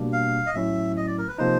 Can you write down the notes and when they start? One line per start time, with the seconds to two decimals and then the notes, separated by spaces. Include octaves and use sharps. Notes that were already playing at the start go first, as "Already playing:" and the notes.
Already playing: B2 G3 A#3 D4
0.13 F5
0.46 D#5
0.54 A2 F#3 A3 C#4 E4 E5
0.97 D#5
1.07 D5
1.18 A#4
1.28 B4
1.38 C3 F3 A#3 D#4 C5